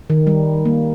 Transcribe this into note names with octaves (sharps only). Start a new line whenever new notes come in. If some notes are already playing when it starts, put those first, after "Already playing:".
D#3
G3
A#3